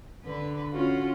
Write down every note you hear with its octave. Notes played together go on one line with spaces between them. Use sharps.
D3 B4
C#4 F4 F#4